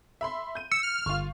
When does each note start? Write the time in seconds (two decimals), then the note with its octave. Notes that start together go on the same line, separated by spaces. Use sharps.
0.21 E5 B5 C6
0.55 G6 D#7
0.72 E6 C#7
0.83 F6
1.06 G1 F4 C#6